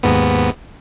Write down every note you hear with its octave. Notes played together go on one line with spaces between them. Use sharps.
D#2 G#2 B3